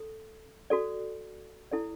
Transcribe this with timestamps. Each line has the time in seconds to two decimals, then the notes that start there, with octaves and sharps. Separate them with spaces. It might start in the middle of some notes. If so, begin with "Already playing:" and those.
Already playing: A4
0.70 F#4 A4 D5
1.72 E4 A4 D5